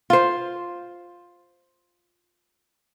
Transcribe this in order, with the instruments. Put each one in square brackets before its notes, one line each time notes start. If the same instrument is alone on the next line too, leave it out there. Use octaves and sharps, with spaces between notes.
[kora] F4 C5